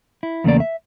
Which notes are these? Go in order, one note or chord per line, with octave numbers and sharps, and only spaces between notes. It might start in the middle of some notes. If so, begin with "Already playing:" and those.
E4
E2 C#3 A3 A#3 D5
E5